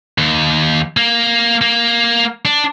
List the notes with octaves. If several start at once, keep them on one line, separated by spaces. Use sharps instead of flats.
D#2
A#3
A#3
D4